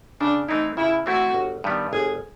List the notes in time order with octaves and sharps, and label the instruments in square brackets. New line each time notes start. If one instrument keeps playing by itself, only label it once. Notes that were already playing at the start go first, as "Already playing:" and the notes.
[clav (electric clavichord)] C#3 [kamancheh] D4
[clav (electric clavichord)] E3 A3 C4 E4 [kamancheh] D#4
[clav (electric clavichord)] C#3 [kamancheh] E4
[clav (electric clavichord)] E3 A3 C4 E4 [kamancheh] F#4
[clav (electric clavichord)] G1
G2 D#3 G3 B3
[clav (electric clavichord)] G1 [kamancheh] G#4